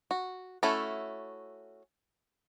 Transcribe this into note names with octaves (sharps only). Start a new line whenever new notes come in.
F#4
A3 C#4 E4 F#4 A4